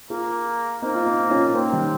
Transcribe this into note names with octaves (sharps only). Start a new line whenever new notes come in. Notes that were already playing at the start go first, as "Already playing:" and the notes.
A#3 F4 G#4
A#3 C4 D#4
F4
C4 D#4
D#4
C#4 F4
A#3 C4 C#4
D#3 G3